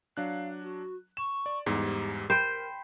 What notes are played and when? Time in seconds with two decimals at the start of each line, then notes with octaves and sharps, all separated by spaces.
0.17 F#3 D4 F5 F#6
0.62 F#4
1.17 C#6 E7
1.46 D5
1.66 E2 G#2 G3 G4
2.30 A#4 C5 G5 B5 D7